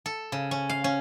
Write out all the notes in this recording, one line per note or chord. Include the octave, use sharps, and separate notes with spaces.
A4
C#3
C#4
F5
C#4